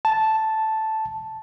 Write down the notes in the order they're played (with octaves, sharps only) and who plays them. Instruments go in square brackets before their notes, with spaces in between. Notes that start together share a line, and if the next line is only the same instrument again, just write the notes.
[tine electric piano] A5